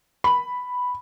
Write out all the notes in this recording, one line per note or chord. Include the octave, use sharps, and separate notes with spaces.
B5